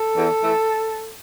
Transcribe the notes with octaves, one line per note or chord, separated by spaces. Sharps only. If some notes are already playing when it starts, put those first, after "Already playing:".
Already playing: A4
E2
E3 A3